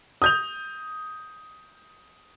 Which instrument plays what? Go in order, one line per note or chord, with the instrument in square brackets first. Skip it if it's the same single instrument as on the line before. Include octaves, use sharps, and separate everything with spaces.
[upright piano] D#6 G6 F7